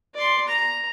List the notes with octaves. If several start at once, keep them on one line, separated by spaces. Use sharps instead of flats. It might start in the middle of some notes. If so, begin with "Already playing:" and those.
D5 C6
A#5